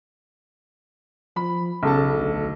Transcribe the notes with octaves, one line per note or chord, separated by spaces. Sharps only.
F3 B5
B1 C#3 A4 A5
D2